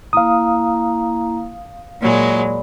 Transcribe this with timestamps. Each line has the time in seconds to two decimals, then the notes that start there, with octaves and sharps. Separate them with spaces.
0.13 A#3 E4 F5 A#5 D#6
2.02 A#2 F#3 G#3 D5 B5